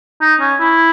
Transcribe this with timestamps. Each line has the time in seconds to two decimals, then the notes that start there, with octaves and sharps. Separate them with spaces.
0.21 D#4
0.40 C#4
0.60 E4